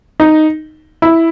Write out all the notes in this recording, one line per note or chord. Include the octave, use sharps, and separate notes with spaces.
D#4
E4